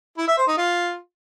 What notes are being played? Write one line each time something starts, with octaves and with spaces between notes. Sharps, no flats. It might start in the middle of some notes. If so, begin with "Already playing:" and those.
E4
E5
C5
D#4
F4